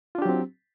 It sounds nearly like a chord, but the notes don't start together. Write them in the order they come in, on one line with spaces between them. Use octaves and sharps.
F4 D4 G4 F#3 C4